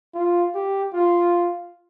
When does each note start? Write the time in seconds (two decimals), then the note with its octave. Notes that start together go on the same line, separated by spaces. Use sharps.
0.14 F4
0.55 G4
0.93 F4